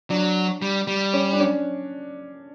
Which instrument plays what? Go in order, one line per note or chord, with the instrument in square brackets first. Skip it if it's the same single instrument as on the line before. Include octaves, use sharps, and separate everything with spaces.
[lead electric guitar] F#3 [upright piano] D4
[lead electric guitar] G3
G3
[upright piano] C#4
D4
C#4